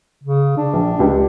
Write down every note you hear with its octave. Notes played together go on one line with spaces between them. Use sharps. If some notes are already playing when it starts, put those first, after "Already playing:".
C#3
D4
A#1
C#2 G4